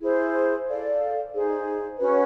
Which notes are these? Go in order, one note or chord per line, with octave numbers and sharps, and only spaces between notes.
E4 G#4 C5
A4 D5 F5
D#4 G#4 C5
C#4 F#4 B4